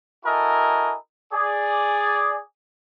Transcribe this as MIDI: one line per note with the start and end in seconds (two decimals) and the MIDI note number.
0.25 0.95 64
0.25 0.95 66
0.25 0.95 69
0.25 0.95 70
0.25 0.95 75
0.25 0.95 80
1.33 2.40 68
1.33 2.40 74